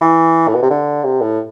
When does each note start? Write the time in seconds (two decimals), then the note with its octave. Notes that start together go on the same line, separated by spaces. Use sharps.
0.01 E3
0.48 A2
0.55 B2
0.63 C3
0.70 D3
1.04 C3
1.21 A2